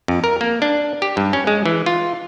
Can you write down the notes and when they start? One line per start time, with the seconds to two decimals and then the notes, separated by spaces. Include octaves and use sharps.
0.08 F2
0.24 A#4
0.41 A#3
0.62 D4
1.02 G4
1.17 G2
1.33 C#4
1.47 G#3
1.66 E3
1.86 F4